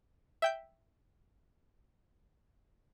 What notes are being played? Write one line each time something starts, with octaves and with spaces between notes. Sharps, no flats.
E5 G5 G6